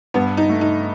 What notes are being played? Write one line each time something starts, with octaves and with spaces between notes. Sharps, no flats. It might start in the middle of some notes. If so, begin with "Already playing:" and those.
G2 B3
D#4
A3
D#4